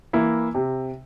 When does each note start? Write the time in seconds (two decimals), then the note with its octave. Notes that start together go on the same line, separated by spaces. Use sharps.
0.13 E3 A#3 E4
0.55 C3